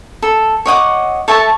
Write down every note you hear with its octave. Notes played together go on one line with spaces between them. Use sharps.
A4
C#5 D#5 F#5 D6
A4 C#5 E5 A5